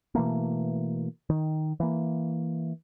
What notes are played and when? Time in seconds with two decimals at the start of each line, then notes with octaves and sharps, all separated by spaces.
0.15 B2 E3 A3 A#3
1.30 D#3
1.80 E3 A#3